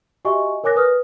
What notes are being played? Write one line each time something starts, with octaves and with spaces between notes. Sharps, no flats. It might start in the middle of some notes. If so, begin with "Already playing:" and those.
F#4 G4 D#5 E5 G#5 C#6
A#4 C#5 G#5 D6 F#6 A#6
B4 D#6 F6